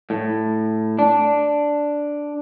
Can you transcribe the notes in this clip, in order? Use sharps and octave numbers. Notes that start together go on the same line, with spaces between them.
A2
D4